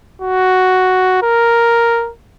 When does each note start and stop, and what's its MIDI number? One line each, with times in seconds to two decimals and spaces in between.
0.22 1.22 66
1.23 2.11 70